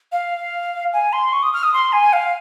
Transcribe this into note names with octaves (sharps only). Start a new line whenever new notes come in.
F5
G#5
C6
C#6
D#6
F6
D#6
C6
G#5
F5